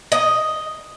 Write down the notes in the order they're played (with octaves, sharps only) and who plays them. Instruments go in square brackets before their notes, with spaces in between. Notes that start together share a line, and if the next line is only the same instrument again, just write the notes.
[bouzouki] D#5